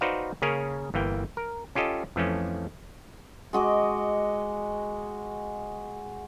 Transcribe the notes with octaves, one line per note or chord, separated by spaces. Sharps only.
D#4 F#4 B4 C5 D5 F5
C#3 A#3 C#4 G#4 A#4 C#5
G1 E3 A#3 G5
A#4
C#4 F4 G4 A4 D#5
F2 E3 F3 A3 C#4
G#3 F#4 D#5 D6